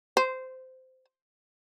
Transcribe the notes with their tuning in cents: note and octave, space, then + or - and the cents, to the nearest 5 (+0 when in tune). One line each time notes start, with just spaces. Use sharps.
C5 -15